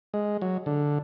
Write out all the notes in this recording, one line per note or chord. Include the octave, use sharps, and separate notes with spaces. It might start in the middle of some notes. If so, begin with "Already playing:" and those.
G#3
F#3
D3